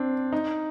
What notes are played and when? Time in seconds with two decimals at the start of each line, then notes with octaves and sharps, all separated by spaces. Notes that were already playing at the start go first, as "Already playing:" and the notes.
Already playing: C4 D4
0.33 D#4